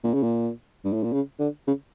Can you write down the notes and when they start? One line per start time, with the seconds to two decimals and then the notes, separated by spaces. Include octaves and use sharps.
0.04 A#2
0.14 C#3
0.23 A#2
0.84 G2
0.93 A2
1.04 A#2
1.13 C#3
1.39 D3
1.67 C#3